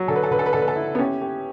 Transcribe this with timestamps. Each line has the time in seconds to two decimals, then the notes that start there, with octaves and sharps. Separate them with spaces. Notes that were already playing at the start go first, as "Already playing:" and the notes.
Already playing: F#3
0.08 D3 A4
0.16 B4
0.23 A4
0.31 D3 B4
0.39 A4
0.46 B4
0.53 D3 A4
0.61 B4
0.68 A4
0.76 E4
0.95 B3
0.99 C#4 G4
1.22 G4